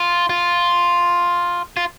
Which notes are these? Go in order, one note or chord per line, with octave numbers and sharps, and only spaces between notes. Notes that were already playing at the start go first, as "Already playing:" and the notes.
Already playing: F4
F4
F4